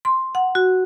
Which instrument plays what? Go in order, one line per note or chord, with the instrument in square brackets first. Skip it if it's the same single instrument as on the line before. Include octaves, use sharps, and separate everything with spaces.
[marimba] C6
F#5
F#4